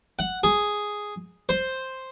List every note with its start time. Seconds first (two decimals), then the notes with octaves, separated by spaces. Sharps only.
0.19 F#5
0.43 G#4
1.49 C5